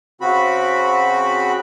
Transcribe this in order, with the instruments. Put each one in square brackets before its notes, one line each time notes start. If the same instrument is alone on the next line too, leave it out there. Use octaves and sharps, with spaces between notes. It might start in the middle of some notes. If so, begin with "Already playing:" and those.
[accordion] C#3 C4 F#4 B5